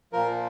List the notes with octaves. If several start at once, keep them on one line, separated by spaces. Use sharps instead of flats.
A#2 F3 A#4